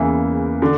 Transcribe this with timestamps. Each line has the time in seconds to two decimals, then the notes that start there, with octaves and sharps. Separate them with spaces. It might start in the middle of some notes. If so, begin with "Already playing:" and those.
Already playing: E2 C#3 E3 A#3
0.62 D3